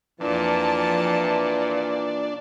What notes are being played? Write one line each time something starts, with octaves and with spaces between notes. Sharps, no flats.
F2 A#2 E3 D4 A5